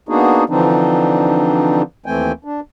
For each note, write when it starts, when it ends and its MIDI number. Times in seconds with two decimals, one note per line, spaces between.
0.09 0.44 58
0.09 0.44 59
0.09 0.44 62
0.09 0.44 63
0.09 0.44 66
0.09 0.44 68
0.49 1.82 50
0.49 1.82 52
0.49 1.82 53
0.49 1.82 60
0.49 1.82 62
0.49 1.82 63
2.06 2.32 39
2.06 2.32 52
2.06 2.32 57
2.06 2.32 60
2.06 2.32 79
2.06 2.32 80
2.44 2.60 62